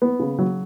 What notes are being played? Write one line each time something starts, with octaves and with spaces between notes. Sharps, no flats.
B3
C#3
F#3